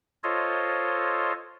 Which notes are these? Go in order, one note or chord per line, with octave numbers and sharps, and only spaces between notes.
F4 A4 C5 C#5 D#5